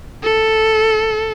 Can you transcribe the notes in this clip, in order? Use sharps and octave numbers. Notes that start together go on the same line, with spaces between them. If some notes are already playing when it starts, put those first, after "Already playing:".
A4